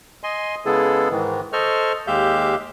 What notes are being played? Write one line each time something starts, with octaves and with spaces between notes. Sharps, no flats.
D#5 G#5 C6
C#3 G#3 B3 E4 G#4 A4
G#2 D#3 E3
A4 C5 D#5 C#6 F6
D#2 G#3 G4 E5 F5 G6